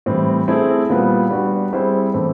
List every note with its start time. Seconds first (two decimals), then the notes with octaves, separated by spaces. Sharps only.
0.06 A2 E3 G3 C4
0.48 A3 C4 E4 G#4
0.89 A#2 G3 B3
1.31 G3 B3 D4 F#4
1.73 G3 C4 E4 G#4 C5
2.14 A2 E3 A3 C4